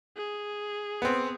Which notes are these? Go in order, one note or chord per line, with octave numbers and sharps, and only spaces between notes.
G#4
B3 C4